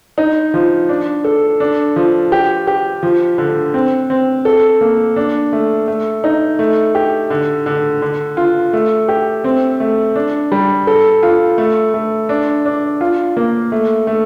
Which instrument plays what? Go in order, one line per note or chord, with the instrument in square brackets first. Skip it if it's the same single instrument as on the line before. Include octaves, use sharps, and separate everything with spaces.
[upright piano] D#4
F3
D4
A4
D4
F3
G4
G4
F3
D3
C4
C4
A4
A#3
D4
A3
A3
D#4
A3
G4
D3
D3
D3
F4
A3
G4
C4
A3
D4
G3
A4
F4
A3
A3
D4
D4
F4
A#3
A3
A3